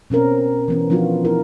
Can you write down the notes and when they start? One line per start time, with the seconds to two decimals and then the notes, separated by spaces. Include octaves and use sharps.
0.10 B2 C4 C#4 A#4
0.68 E3 B3 C#4
0.90 F3 B3 D4 F4 F#4
1.25 D#4 E4 A#4